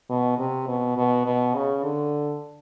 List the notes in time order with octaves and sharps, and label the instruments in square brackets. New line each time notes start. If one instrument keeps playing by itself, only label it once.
[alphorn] B2
C3
B2
B2
B2
C#3
D3